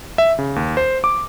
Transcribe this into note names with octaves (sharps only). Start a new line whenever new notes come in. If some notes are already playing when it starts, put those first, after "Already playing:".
E5
C#3
D#2
C5
D6